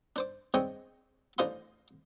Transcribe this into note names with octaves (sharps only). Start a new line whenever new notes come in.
D4 C5 D6
G#3 C4 D4 C#5 D#5 G5
A1 D4 C5 D#5 F5 C6